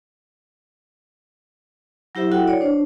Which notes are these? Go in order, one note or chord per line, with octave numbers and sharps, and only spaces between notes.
F#3 E4 G4 C5 E5
E4 F#4 A4 E5 F#5 G5
C#5 D5
D4 C5